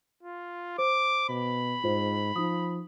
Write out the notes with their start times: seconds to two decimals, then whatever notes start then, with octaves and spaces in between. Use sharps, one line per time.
0.23 F4
0.78 C5 D6
1.29 B2 B5
1.84 G#2 F4 C5
2.36 F3 D#4 D#6